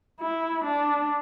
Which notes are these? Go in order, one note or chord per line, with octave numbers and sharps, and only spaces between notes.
E4
D4